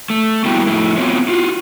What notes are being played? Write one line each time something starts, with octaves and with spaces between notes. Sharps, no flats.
A3
G3 A#3 B3 E4 F#4 G4
F2 A3 E4
B3 C4 F4 F#4 C#5
F4 F#4